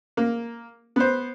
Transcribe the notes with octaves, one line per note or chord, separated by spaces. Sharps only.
A#3
B3 C5